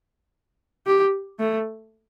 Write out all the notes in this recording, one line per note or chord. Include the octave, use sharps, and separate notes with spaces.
G4
A3